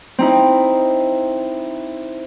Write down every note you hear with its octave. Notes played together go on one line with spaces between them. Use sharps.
C4 D#4 E4